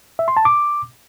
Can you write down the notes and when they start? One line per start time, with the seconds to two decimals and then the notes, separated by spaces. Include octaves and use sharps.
0.19 E5
0.28 C6
0.37 A5
0.45 D6